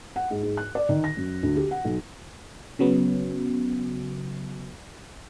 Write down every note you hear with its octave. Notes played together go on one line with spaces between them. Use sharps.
F#5
G#2
G#2
F#6
D5
D#3
A#6
F#2
D2
G4
F#5
B1
C#3 F#3 B3